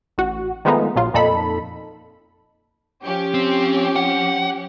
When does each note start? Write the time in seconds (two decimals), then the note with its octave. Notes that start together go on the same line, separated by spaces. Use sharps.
0.18 A1 F#4
0.65 D#3 F3 G#3 A3 B3 D#4
0.96 A#1 F#3 F4
1.14 F2 A#2 D#4 A4 B5
3.02 F3 C#4 G4
3.34 C4
3.96 F#5